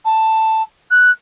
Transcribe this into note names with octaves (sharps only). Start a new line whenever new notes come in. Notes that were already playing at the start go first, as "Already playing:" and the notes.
A5
F#6